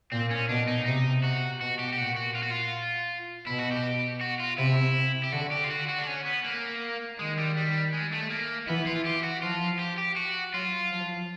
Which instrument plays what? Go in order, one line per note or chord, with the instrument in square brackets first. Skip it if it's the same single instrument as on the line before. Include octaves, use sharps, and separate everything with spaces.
[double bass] A#2 [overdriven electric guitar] C4
[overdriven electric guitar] C#4
[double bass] B2 [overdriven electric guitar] D4
[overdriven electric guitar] D#4
[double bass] C3 [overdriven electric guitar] D#4
[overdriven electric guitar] F#4
[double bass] B2 [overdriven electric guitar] F#4
[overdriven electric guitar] G4
G4
[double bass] A#2 [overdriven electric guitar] F#4
[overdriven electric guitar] F#4
F4
F#4
F4
[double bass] B2 [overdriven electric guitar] E4
[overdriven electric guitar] F#4
G4
F#4
F4
[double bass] C3 [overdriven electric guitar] E4
[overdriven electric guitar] G4
[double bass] D3 [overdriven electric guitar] F#4
[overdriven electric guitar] G4
F4
F#4
F#4
D4
C#4
B3
A#3
[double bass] D#3 [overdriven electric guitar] G#3
[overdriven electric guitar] G3
G3
G#3
A3
A#3
[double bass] E3 [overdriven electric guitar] B3
[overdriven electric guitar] F4
G4
F#4
[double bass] F3 [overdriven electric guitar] F4
[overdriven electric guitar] G4
G4
F#4
[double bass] F#3 [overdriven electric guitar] F4
[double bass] F3